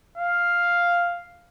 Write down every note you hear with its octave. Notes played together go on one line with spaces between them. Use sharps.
F5